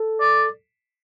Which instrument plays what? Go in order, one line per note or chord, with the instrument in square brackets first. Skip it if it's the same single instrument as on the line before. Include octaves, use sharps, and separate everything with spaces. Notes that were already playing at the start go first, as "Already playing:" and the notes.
Already playing: [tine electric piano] A4
[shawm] D5